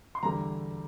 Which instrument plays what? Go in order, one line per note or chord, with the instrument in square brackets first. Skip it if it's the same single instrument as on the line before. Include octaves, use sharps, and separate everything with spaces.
[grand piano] C6
E2 D3 G3 A#5